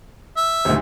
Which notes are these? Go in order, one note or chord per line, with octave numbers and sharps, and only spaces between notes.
E5
D#1 G#1 D2